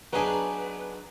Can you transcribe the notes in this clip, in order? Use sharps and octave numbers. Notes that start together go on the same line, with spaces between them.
F#3 B3 D4 D#4 G#4 B4 G#5